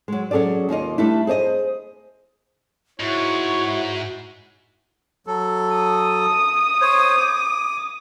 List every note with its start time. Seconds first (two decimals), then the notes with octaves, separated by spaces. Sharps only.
0.08 F#3 G#3
0.31 F#3 C#4 G#4 A4 D5
0.69 D#2 A#3 F4 D#5
0.98 G3 A3 D4 E4
1.27 G#4 C5 D5 D#5
3.00 G#2 E4 F#4 C#5
5.27 F#3 A4
5.76 D#6
6.81 C5 C#5
7.17 D6